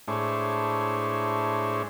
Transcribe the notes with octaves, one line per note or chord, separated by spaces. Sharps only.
A2 G#3 D4 E4 C5 C#5